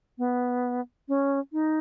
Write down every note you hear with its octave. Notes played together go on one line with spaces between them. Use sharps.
B3
C#4
D#4